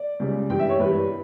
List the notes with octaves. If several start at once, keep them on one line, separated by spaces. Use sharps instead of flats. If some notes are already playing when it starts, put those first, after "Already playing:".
Already playing: D5
C#2 C#3 G3
G2 E3 G3 G5
E5
C#5
G2 E3 G3 B4